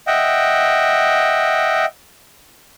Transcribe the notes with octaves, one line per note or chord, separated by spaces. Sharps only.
D#5 E5 F#5 G5